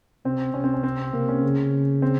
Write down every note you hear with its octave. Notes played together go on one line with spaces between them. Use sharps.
C3 C4
C3 C#4
C4
C#4
C4
C3 A#3
C#4
C#3
C4